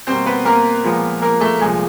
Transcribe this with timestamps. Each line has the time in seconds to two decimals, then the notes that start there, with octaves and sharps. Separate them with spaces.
0.07 B2 G3 A#3 C4 C5
0.26 B3 B4
0.45 A#3 A#4
0.84 A#2 F3 G#3 B3
1.22 A#3 A#4
1.41 A3 A4
1.60 C2 A#2 F3 G#3 G#4